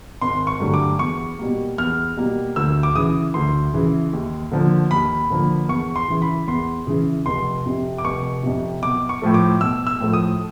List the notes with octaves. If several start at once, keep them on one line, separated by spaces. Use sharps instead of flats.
G#1 C6
C#6
G2 D3 F#3 A3
D6
E2 C#6
B2 G3 A#3
E2 F6
B2 G3 A#3
D2 E6
D6
C#3 E3 D#6
D2 C6
C#3 E3
D#2
D3 F3 A#3
D#2 B5
D3 F3 A#3
E2 C#6
C6
C#3 E3
B5
E2 C6
C#3 E3
F1 C6
F2 C3
D6
F1 C#6
F2 C3
B1 D6
C#6
A2 F3 A3
D6
B1 E6
E6
A2 F3 A3
D#6